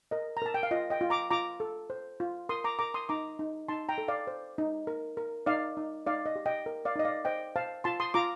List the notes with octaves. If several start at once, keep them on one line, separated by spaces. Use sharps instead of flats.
A#4 D#5
A#5
A#4 A5
G5
F5
F4 D#5
D#5 G5
F4
A#5 D6
F4 A#5 D6
A4
C5
F4
A#4 C6 D#6
A#5 D6
A#4 A#5 D6
C6 D#6
D#4 A#5 D6
D#4
D#4 A5 C6
G5 A#5
A4
D5 F5
C5
D#4
A#4
A#4
D#4 D5 F5
D#4
D#4 D5 F5
D#5
G4
D#5 G5
A#4
D5 F5
D#4 D#5
D5 F5
C5 D#5 G5
C5 F5 A5
F4 A5 C6
C6 D#6
F4 A#5 D6